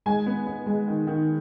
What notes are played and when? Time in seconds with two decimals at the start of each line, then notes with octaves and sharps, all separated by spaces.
0.06 G#3 G#5
0.26 B3
0.47 B3
0.66 G#3
0.88 D#3
1.07 D#3